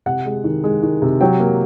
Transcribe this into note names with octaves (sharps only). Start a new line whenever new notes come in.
C3 F#5
G#3
D#3
G#3
D#3
C3
F#3 G5
A#3